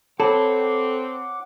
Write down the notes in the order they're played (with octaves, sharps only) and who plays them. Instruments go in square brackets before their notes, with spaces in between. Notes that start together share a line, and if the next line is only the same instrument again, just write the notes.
[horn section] C4 [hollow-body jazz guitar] A4 [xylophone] C#5 A5 B5 [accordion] F#5 D6